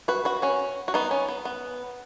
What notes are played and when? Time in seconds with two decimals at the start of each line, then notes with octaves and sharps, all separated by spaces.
0.08 F#4 B4
0.25 F#4 B4
0.42 C#4 F#4
0.88 F#4
0.94 B3 D#4
1.11 C#4
1.29 B3
1.45 B3